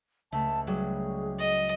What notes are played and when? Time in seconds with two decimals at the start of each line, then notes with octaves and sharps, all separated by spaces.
0.32 C#2 A3 A5
0.67 F#3 G3 G#4
1.39 D#5